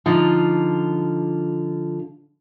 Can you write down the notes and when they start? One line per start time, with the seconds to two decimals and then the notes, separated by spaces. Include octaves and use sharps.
0.06 D3 F3 D#4 F4